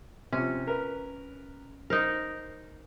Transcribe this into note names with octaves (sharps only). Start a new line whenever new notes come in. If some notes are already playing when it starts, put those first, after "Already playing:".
C3 F3 C#4
A#4 B4
D#4 A#4 C5